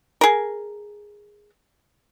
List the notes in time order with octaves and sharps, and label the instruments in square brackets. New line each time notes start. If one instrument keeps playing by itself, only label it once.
[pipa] G#4 A#4